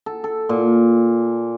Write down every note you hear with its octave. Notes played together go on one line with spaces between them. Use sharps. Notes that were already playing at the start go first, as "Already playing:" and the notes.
A4
A4
A#2